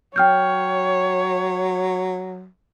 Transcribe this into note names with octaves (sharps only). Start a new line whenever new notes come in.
F#3 C#5 G5 F6 G6